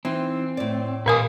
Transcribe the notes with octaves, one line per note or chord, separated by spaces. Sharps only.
E3 C4 D#4
A2 D5
A#2 A#4 B4 F5 G#5 D#6